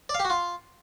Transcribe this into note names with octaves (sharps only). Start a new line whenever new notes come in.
D5
F5
G4
F#4
F4